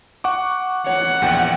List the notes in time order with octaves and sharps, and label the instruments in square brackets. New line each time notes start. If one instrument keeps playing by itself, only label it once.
[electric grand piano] F#5 C#6 D6
[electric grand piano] C#5 [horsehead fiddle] F#5
[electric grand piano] A#1 E2 G5